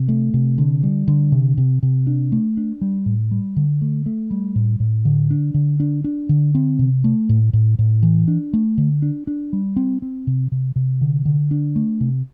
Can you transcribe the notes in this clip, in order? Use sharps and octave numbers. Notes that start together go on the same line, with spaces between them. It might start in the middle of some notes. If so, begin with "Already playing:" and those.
Already playing: C3
A3
C3
D3
G3
D3
C3
C3
C3
D4
A3
D4
G3
A2
G3
D3
A3
A3
G3
A2
A2
D3
D4
D3
D4
D4
D3
C4
C3
A3
A2
A2
A2
E3
D4
A3
D3
D4
D4
G3
C4
C4
C3
C3
C3
D3
D3
D4
A3
C3